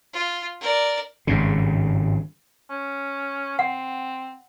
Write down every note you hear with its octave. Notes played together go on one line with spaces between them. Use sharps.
F4
A#4 D5
G#1 G2 C#3
C#4
C4 F#5